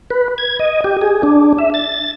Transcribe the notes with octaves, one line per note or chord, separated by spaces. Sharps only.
B4
G#6
D#5
G4
G#4
D4
E5
A6